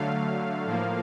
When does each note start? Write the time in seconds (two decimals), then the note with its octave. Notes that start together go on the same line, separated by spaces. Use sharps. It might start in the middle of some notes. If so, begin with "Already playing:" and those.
Already playing: D3 F#3 A3 F5
0.65 A2 F3 A#3